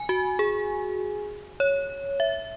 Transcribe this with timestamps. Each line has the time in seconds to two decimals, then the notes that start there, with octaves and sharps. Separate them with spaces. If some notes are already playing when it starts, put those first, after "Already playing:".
Already playing: G#5
0.09 F#4
0.39 G#4
1.60 C#5
2.20 E5